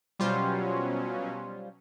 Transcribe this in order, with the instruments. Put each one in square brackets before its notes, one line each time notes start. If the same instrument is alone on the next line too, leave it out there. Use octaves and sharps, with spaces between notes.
[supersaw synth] B2 F#3 C#4 [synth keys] G3 F4 C5